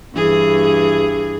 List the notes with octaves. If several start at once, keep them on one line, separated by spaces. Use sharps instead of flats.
G2 E3 G#4